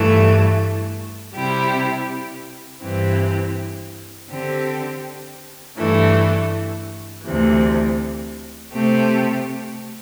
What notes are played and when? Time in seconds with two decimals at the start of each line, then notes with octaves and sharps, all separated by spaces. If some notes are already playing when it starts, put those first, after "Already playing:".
Already playing: G2 E3 A3
1.35 C3 G3 E4 G4
2.82 G2 E3 C4 G4
4.29 D3 C4 G4
5.76 G2 E3 A3 D4
7.24 D2 C3 E3
8.72 C3 A3 C4 G4